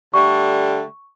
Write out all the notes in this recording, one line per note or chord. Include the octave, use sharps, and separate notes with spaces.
D3 G3 A3 C#6